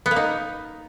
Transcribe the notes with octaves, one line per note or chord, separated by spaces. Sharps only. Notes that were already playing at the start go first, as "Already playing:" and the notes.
B3
A#3
D#4